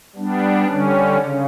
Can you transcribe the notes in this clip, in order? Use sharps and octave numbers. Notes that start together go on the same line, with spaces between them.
G3 B3 D4
D3 G3 C#4
C#3